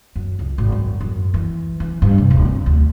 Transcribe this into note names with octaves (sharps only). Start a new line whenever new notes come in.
F#2
C#2
G#1
F#2
F#2
E3
E3
G2
C3
D1
C4
D2